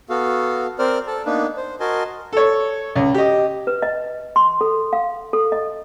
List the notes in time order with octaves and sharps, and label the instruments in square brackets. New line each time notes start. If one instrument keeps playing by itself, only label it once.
[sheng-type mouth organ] B3 F#4 A4 F5
C4 A#4 C5 D5 F6
A4 A5
A#3 B3 D4 D#4 B4
C5
F#4 A#4 D#5 G#5 A5 C6
[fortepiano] A4 C#5
C#2
G4 D#5
[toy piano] B4
D#5
C6
A4
F5
A4
D#5